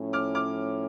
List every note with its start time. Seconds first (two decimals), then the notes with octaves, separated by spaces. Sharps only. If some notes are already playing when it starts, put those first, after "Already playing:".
Already playing: A2 F3 C#4
0.13 D6 F6
0.35 D6 F6